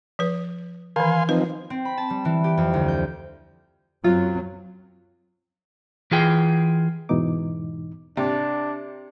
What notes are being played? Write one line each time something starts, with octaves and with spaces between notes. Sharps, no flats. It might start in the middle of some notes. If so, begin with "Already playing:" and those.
F3 B4
D#3 E3 F5 G#5 C6
F3 C4 D#4 B4
C4
B5
A5
G3
E3
G4
F2
D2
G6
F#2 F#3 C4 F4
E3 F4 G#4 G5
E2 G#2 B2 E3 D#4 D6
C3 D4